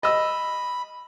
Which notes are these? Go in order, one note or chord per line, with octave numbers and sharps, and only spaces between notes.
D#5 B5 E6